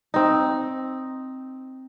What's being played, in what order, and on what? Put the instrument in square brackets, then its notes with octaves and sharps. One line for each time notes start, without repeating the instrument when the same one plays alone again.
[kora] C4 D#4